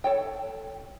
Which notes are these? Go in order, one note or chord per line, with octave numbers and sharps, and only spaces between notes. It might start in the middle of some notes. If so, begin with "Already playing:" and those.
A4 C#5 G5